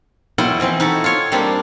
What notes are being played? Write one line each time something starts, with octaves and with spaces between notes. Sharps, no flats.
B2 F#3 E4 F4 D#5 G5
E3 F3 C4
D#4 E4 F#4 A4
F4 C#5
G3 A#3 C4 D4